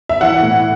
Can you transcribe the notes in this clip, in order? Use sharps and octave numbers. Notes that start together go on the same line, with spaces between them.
E5
E3 F#5
A2